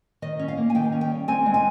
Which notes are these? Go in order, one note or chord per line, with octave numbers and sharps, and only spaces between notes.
D#3 D#5
C#4
F5
A#3
G#5
D#3 G5
C#4
G5
G3
C4 G#5
G#3
G#5